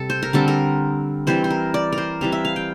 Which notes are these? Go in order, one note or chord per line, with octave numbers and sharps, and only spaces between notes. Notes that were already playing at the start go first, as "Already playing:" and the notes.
Already playing: C3 G3 A4
C5
A#4
D3 G3 C4 A4
A#4
E3 G3 C4 C5
C5
A#4
D5
A#4
C5
E3 G3 C4 F5
E5
F5
G5